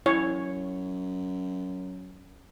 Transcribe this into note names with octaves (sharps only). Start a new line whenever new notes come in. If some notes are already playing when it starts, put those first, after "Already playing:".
F#2 E4 C#5